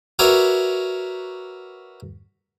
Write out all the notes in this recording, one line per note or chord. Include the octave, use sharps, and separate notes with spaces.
F#4 A#4 B4 C#5 D5 E5